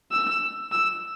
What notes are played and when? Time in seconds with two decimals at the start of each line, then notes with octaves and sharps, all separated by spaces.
0.12 E6
0.72 E6